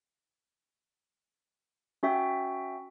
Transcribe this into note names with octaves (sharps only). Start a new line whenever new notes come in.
C#4 F#4 E5 G5